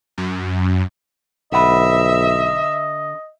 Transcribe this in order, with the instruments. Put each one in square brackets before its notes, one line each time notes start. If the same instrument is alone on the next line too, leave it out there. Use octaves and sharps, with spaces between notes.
[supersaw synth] F#2
[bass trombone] B1 [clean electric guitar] D3 F#5 B5 [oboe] D#5 [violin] E5